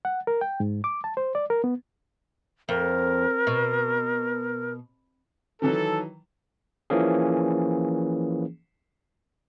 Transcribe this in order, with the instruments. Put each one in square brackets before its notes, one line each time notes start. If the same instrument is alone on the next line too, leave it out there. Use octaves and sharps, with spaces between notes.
[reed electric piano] F#5
A#4
G5
G#2
D6
A5
C5
D5
A#4
B3
[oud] F2 [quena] A#4
[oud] B2
[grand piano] D#3 E3 F#3 [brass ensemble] A4
[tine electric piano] E3 F3 A#3 C#4 G#4